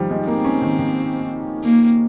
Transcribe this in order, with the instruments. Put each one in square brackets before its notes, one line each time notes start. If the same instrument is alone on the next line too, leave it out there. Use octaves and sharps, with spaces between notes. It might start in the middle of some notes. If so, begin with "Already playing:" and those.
Already playing: [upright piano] D#3 F3 G3
G#3
[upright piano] A#3 [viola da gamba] C4
[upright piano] C#4
D#3
D#3
[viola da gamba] A#3